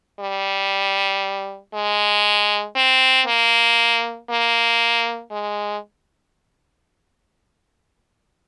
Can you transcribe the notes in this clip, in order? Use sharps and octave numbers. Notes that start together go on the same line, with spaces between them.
G3
G#3
C4
A#3
A#3
G#3